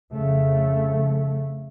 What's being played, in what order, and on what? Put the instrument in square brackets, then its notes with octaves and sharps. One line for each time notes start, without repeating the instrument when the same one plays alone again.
[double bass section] F2 C#3 A3